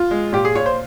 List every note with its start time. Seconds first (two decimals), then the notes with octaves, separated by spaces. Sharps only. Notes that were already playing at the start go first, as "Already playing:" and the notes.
Already playing: F4
0.11 G#3
0.33 A#2 G4
0.45 G#4
0.55 A#2 C#5
0.66 C5